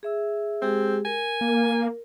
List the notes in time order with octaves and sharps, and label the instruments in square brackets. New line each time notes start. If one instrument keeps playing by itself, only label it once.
[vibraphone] G#4 E5 E6
[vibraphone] G#3 G4 G#4 [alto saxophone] C4
[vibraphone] A#4 [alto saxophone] G#5
[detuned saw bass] A#3